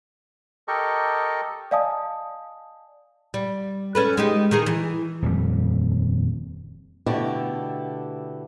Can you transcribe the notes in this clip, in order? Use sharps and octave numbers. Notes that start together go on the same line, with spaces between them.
G4 A4 A#4 D#5 C#6
D5 D#5 F5 G#5 A5 D#6
G3
C#4 A4 B4
G#3 D#4 G4
D#3 D#4 G#4
E3
D#1 F2 G3
B2 D3 A3 E4 G4